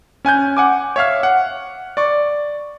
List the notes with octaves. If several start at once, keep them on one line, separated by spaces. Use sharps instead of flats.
C#4 G#5 F#6 G6
F#5 G#5 D6
C#5 E5 F5 F6
F#5
D5 C#6